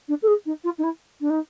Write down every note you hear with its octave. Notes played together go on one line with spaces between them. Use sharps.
D4
A4
G#4
D#4
F4
D#4
E4
D4
D#4